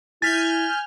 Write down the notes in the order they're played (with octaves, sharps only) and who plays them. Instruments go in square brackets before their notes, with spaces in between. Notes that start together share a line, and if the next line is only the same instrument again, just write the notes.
[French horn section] E4 [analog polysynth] G#5 F6 G6 [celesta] A6 B6